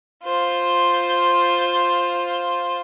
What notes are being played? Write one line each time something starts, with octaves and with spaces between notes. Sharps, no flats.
F4 C5